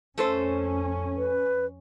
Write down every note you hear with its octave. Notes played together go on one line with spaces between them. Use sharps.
F2 A3 C#4 A4 C5
B4